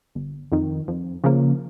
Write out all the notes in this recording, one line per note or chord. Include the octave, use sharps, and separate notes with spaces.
G1
F2 D#3
F2
C#3 F3 A#3